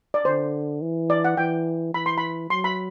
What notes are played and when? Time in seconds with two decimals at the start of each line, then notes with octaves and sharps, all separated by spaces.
0.14 D5
0.25 D3 C5
0.82 E3
1.10 D5
1.25 F#5
1.37 E3 G5
1.94 E3 B5
2.06 C6
2.18 B5
2.50 F#3 C6
2.64 B5